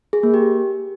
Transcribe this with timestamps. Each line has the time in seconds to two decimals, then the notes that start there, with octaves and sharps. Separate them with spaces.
0.13 G#4
0.23 A#3
0.34 G4